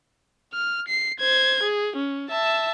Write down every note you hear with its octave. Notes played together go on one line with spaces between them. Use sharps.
F6
C7
C5 G#6
G#4
C#4
E5 A5